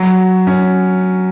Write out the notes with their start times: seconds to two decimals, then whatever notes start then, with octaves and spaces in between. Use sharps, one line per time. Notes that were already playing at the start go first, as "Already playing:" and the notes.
Already playing: F#3
0.47 C#4